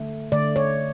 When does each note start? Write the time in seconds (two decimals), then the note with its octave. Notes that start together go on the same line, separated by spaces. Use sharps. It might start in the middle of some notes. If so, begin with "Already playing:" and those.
Already playing: D3 A3
0.32 D3 A3 D5
0.56 C#5